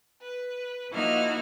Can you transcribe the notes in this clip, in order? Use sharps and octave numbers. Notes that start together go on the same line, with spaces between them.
B4
F3 A#3 D#4 E4 F#4 F6